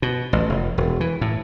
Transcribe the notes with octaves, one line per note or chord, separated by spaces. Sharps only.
B2
A1
F1
E1
E3
A2